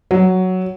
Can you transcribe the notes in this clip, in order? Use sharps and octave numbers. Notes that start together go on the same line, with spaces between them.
F#3